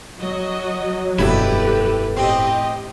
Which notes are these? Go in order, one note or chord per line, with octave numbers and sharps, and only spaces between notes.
F#3 F#4 D#5
F1 G2 B2 E4 G4 A4 B4
A1 C4 G4 D#5